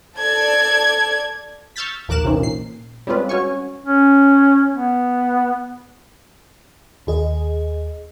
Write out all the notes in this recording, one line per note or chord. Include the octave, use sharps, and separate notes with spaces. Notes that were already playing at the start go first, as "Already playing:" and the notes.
A4 D5 A5 G#6
C#6 E6 F6 G6 A6 B6
A#1 D#2 A#4 D6 F#6 E7
C3 E3 A#3 C4 C#4 D#4
A#2 C7
G3 G#3 C4 C#4 F4 B4
C#4 F#4 C#5 G#5 C#6
C#4
B3
D#2 G#4 D#5